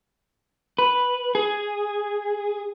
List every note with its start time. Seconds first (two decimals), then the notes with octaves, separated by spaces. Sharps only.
0.79 B4
1.35 G#4